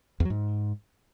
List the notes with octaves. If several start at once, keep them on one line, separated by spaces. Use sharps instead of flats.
E2
F#3
G#2